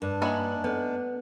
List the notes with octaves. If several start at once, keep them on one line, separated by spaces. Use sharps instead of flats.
G2 D4
A#3 D#4 E4 C#5 G#5 F#7
B3 A4 B4